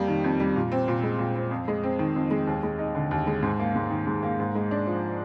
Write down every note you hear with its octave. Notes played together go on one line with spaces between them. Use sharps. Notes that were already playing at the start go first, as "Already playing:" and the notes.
Already playing: F2 G3 A#3
D#3
F2
G3
A#2
C4
A#2
G#3
A#2
C4
F2
G#3
C4
D#3
F2
G#3
D#2
G#3
D#4
D3
D#2
G#3
G#2
A#3
G#2
D#3
G#2
A#3
G#2
G#3
D4
F3